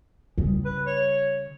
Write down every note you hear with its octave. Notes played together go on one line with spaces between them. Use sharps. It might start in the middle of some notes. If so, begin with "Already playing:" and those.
C#3 G3
B4
C#5